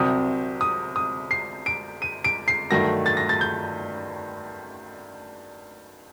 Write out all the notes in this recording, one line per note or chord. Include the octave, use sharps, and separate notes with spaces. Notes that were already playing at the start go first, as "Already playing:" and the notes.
Already playing: C2 C3 F#3 C4 D#6
D#6
D#6
C7
D7
D#7
D7
C7
G2 D#3 F#3 A3 A#6
A6
A#6
A6
G6